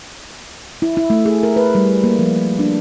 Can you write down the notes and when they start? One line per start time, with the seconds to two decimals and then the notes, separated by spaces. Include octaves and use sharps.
0.82 E4
0.97 E4
1.10 A3
1.26 G#4
1.43 A#4
1.56 B4
1.75 G3
2.04 A#3
2.19 F3
2.59 D4